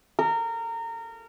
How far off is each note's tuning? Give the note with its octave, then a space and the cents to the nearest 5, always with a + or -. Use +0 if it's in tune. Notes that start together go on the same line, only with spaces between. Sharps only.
A#4 -25